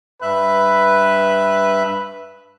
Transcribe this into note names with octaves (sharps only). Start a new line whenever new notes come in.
G2 B4 E5 F#6